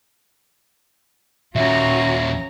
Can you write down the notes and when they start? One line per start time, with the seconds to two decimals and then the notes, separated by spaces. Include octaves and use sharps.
1.56 D#2 A#2 C#4 F4 F#4 E5 A#5